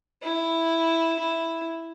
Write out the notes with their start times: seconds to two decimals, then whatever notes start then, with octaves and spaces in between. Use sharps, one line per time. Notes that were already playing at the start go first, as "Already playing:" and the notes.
0.22 E4
1.19 E4